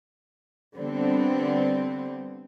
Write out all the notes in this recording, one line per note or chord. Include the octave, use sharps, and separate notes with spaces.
D3 G3 B3 C4